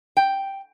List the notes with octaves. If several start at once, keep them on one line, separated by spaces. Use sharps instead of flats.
G5